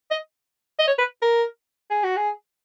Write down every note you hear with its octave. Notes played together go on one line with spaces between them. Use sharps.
D#5
D#5
C#5
B4
A#4
G#4
F#4
G#4